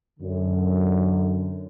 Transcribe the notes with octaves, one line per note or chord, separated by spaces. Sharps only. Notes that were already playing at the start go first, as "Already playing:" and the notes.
F#2 D3